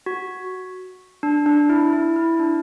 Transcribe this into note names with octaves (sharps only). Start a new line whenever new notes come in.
F#4
D4
D4
E4
E4
E4
D4